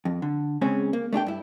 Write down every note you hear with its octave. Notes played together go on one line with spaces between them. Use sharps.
F2
D3
C#3 G#3 C4 C#4
A#3
A3 D4 G4 G5
G2 E4